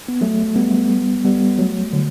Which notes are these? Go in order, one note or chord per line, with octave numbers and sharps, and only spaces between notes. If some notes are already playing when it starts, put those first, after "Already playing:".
B3
F#3 A3
G3 B3
G3 B3
F#3 A3
D3 F#3